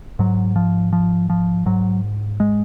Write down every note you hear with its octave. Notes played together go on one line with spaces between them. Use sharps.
G#2 F#3
F3
F3
F3
G#2 F#3
G#3